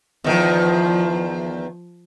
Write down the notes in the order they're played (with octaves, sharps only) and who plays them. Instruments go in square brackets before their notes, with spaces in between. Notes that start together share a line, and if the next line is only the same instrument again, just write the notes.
[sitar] E2 D#3 [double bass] F3